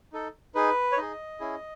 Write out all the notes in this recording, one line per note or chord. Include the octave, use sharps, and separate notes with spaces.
D#4 A4
D#4 G#4 B4
C#5
D#4 G#4 D#5
C#4 E4 G#4